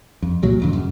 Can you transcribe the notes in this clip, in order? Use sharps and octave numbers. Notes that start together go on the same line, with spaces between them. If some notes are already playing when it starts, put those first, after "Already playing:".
F2
C2 A#2 F#3
D1 F2 D3
F#2 C#3